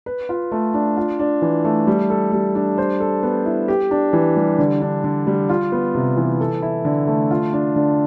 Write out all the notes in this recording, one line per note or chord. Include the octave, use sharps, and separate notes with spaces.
B4
F4
A3
D4
F4
D4
E3
A3
G3
A4
G3
D4
C5
A4
B3
E4
G4
D4
E3
G3
D3
D4
D3
G3
F4
B3
C3
E3
A4
E4
D3
A3
F4
D4
D3